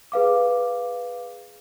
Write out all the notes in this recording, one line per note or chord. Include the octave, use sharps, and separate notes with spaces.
G#4 B4 F5 D6